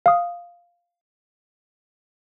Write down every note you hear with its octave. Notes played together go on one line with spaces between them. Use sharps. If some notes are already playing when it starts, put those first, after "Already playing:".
F5 D#6